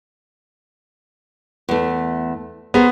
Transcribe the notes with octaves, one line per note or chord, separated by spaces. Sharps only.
E2 A3
B3 G#4 A#4 C5